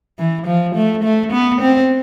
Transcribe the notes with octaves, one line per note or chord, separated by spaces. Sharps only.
E3
F3
A3
A3
B3
C4